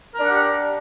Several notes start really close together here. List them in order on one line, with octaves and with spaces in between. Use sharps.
A#4 D4 F#5 G4